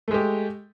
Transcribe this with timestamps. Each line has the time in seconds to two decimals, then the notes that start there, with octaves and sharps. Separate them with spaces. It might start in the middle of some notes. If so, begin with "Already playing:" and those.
0.08 A3
0.11 G#3
0.14 G4